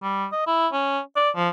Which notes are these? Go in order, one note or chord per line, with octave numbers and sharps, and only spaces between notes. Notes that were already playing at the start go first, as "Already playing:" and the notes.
G3
D#5
E4
C#4
D5
F3